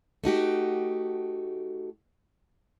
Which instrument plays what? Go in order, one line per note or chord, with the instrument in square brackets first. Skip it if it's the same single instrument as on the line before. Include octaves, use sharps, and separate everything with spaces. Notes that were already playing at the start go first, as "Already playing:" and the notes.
[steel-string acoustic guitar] A3 D#4 F#4 G4